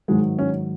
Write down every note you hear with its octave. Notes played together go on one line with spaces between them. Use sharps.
G#2 D#3 F#3 G#3
C#4